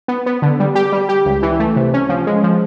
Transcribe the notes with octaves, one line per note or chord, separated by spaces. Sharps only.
B3
B3
D3
G3
G4
G3
G4
C#2
E3
A3
C3
C#4
F3
G#3
F3